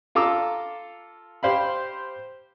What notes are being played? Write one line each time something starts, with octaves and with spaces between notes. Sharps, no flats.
F4 A4 A#5 D6 E6
G4 C5 F5 B5